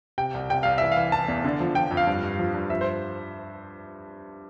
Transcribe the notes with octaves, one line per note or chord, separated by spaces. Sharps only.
C3 G5
C2
C3 G5
C2 F5
E3 E5
E3 F5
E3 A5
E2
D3
F3
F3 G5
F2
F5
G2
G2
F3
G2
F3 E5
C5